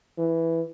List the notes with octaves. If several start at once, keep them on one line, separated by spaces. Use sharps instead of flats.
E3